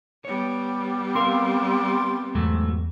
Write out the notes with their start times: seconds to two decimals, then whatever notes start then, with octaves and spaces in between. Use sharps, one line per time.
0.25 G3 B3 C#5
1.15 C4 A#4 F5 C6
2.35 E2 G#2 F#3 A3